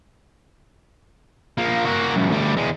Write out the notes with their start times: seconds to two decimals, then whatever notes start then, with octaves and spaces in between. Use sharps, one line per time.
1.58 F3 A#3
1.86 A#3 F#4
2.16 C#2 F#2
2.30 D2 G3
2.57 E2 G#3